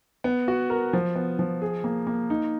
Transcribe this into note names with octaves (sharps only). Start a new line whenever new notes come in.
B3
F#4
A#4
F3
B3
F3
G#4
A#3
A#3
D#4